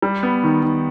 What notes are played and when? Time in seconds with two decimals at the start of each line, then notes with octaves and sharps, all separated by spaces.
0.02 G3
0.23 B3
0.43 D#3
0.63 D#3